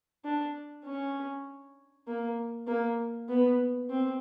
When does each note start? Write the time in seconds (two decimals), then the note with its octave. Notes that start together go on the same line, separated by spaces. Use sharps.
0.24 D4
0.85 C#4
2.07 A#3
2.67 A#3
3.29 B3
3.90 C4